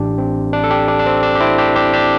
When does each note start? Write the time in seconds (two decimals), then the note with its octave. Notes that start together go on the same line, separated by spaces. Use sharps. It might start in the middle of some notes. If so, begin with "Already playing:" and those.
Already playing: A1 A2 E3 D4 G4
0.18 C4
0.53 D4
0.64 A4
0.71 D4 G4
0.88 D4
0.99 D4
1.06 C4
1.23 D4
1.35 G4
1.40 C4 E4
1.58 D4 G4
1.76 D4 G4
1.94 D4 G4